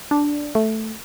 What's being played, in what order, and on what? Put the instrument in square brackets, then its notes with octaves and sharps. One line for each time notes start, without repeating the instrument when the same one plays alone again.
[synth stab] D4
A3